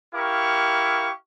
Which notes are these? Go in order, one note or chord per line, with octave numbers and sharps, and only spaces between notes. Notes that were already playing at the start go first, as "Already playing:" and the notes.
E4 G4 A#4 F5 C#6